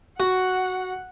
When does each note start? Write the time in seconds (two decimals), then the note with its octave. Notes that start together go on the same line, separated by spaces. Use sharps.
0.20 F#4 F#5